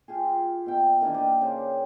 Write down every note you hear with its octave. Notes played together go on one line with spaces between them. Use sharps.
F4 G4 G#4
B2 G5
D#3 E3 A#3 D4
G4 D5 D#5
C#3 C5